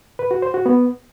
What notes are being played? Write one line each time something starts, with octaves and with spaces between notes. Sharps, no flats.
B4
F#4
C5
F#4
B3